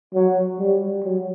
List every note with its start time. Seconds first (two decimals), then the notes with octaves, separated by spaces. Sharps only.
0.15 F#3
0.59 G3
1.04 F#3